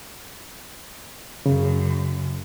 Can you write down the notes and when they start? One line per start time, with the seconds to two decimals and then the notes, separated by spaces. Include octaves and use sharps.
1.46 F#2 C#3